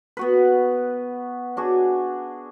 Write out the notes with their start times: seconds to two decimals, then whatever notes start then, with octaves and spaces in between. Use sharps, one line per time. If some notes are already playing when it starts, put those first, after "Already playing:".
0.17 B3 F#4 B4
1.57 D4 F#4 G#4